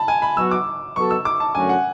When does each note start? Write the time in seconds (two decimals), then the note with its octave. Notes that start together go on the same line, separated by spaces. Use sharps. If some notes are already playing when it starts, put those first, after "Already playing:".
Already playing: A5 B5
0.08 G#5
0.22 B5
0.37 F#3 B3 F#4 E6
0.51 D6
0.95 F#3 B3 F#4 A4 C#6
1.11 E6
1.25 D6
1.40 A5
1.55 F#2 D3 A3 C#4 F#4 G#5
1.69 F#5